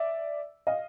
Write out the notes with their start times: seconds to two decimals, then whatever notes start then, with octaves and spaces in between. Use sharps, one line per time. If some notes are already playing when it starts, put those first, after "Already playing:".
Already playing: D5 E5
0.67 D#5 F5